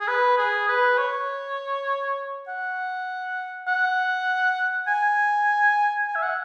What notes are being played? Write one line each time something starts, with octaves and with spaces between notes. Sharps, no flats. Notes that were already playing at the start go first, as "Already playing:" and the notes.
G#4
B4
G#4
B4
C#5
F#5
F#5
G#5
G#5
E5
F#5